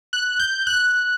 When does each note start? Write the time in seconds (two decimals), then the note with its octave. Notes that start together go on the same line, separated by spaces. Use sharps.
0.13 F#6
0.39 G6
0.67 F#6